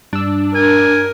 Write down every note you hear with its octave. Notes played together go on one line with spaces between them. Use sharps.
G2 D4 E6
A#4 G#5